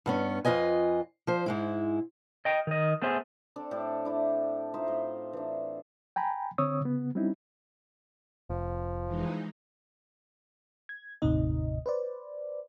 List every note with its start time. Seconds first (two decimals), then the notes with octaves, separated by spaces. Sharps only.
0.06 G2 B3 C#4
0.45 F2 F4 B4 D#5 G#5
1.27 F3 C5
1.46 G#2 G#3 E4
2.45 D#5 G5
2.67 D#3 D#5
3.02 A3 B3 G#4 C5 E5
3.56 C4 D4 A4
3.71 A2 D4 G4 A4
4.05 D4 E4 D5
4.74 D#4 F4 C5 E5
4.87 A2 C6
5.33 E3 D4
6.16 G5 G#5 A#5 B5
6.58 D3 C4 C#5 C#6 D#6 E6
6.81 C#3 B3
7.15 G3 C4 C#4 D#4 E4
8.50 F1 F3
9.06 E3 G#3 D#4
10.89 G#6
11.22 G1 D#2 A2 C3 D#4 D#5
11.86 B4 C5 D5